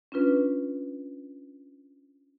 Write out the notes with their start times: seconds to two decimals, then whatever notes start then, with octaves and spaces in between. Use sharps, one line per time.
0.12 C#4 D4 F4 B4